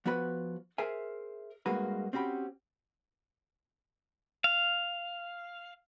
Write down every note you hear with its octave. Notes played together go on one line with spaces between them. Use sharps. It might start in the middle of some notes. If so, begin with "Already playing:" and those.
F3 B3 F#4 B4 B5
G#4 A#4 C5 E5 G#5
G2 G#3 A#3 F#4 B4
C4 C#4 F#4 G4 B5
F5